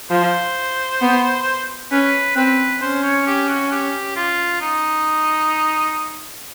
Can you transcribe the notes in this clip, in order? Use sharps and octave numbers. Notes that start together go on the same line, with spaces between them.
F3 C5
B3
C#4 B4
C4 B4
C#4 C5
C#5
G4
F#4
G4
F4
D#4